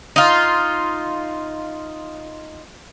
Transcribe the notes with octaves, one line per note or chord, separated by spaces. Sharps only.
D#4 F4